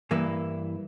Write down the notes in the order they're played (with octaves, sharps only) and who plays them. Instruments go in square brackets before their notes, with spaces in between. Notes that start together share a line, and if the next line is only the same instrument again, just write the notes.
[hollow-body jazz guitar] G2 E3 A#3 E4 B4